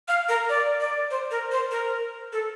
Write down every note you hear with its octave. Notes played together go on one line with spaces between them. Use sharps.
F5
A#4
D5
D5
C5
A#4
C5
A#4
A4